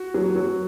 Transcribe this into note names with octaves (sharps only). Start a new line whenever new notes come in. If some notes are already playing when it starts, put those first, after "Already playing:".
Already playing: F#4
F#3
F#3